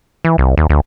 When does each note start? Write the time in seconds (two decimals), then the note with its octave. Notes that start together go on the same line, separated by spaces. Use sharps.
0.25 E3
0.38 C2
0.57 D#2
0.70 D2